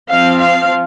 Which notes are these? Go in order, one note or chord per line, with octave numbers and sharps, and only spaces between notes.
F3 C4 F5
F5